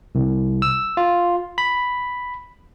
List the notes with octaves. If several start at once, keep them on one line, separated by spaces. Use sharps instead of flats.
C2
E6
F4
B5